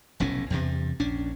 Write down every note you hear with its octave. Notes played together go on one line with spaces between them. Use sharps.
F1 B1 A2 C#4
E2 G2 C3
A#1 C#4 D4